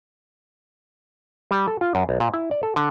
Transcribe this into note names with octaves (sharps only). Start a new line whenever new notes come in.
G3
A4
F4
F#2
B1
A#2
E4
D5
A4
D3